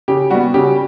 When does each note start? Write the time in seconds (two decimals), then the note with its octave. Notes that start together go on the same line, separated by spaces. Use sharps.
0.08 C#3 G4
0.31 G3 B3 F#4
0.54 C#3 G4